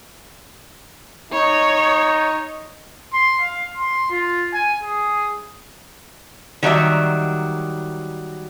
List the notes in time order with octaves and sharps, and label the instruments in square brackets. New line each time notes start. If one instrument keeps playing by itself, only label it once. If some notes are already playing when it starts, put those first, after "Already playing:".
[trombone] D#4 [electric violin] C#5
[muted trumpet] C6
F5
C6
F4
G#5
G#4
[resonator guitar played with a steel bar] D#3 F#3 G3 E5